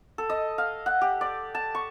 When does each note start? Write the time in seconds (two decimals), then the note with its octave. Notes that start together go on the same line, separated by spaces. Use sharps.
0.18 A4
0.30 D#5
0.58 F5
0.86 F#5
1.01 G4
1.21 D5
1.55 A5
1.75 C#6